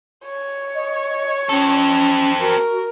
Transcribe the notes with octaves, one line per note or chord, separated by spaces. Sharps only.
C#5
D#5
C4 C#4 A4
F#4 A#4